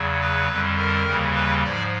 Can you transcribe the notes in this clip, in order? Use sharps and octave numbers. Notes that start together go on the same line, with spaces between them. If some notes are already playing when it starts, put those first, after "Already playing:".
Already playing: E2 C#3 F#3
B4
F2 D3 G3
A#4
D#2 C#3 E3 G3
B4
G#2 F3 D5